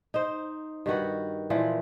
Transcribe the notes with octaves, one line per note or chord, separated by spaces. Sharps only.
D#4 C5
G2 D#3 F#4 B4
A#2 E3 F3